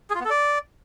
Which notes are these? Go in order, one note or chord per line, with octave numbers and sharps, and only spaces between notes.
G#4
F4
B3
A4
D5